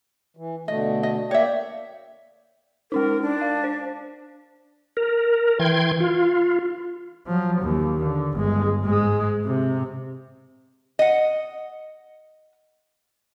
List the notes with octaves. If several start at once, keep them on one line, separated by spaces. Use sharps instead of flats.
E3
B2 D3 A3 D#5
D#5
A#3 C#5 D5 E5 G5
G#3 C#4 D#4 A#4
D4
F5
C5
A#4
E3 G5 C6 G#6
F4
F3 F#3
D#2
D3
G1 G#3
G#2 G#3
C3
D#5 F#5